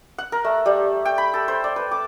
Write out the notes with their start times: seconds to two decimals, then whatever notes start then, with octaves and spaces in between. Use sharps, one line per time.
0.18 F#5
0.32 A#4
0.44 A3
0.66 G3
1.05 G5
1.18 B5
1.34 A4
1.48 C5
1.64 D5
1.76 B4
1.91 D6